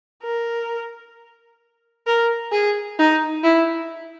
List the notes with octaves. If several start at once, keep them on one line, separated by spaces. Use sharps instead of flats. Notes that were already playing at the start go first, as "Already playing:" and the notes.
A#4
A#4
G#4
D#4
E4